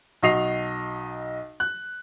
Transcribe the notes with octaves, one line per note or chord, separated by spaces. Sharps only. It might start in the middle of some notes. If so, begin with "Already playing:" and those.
B1 F#4 D#5 C7 F7
F#6